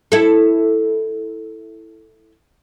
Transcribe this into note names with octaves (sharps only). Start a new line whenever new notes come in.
E4 A4